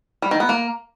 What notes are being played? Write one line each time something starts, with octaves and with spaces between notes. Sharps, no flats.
G3
D#3
B3
A#3